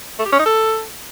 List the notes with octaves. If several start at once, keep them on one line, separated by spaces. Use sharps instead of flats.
A3
G4
C#4
D#4
A4